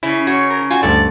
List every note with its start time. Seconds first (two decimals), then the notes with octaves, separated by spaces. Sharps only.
0.03 C#3 E4
0.27 F#4 C#5
0.50 A#4
0.71 F4 F#4 G#5
0.83 D2 G2 A4 D5